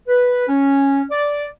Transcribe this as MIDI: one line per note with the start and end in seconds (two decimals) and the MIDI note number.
0.07 0.46 71
0.49 1.03 61
1.11 1.46 74